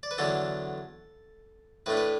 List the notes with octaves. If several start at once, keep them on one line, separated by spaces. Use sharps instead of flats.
D5
B4
E2 D3 F#3 D4 A4
A2 A3 D4 B4
B4